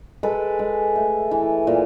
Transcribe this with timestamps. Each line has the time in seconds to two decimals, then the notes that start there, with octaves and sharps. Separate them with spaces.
0.23 G#3 A4 B4
0.59 G#3
0.96 A3
1.31 E3
1.67 A#2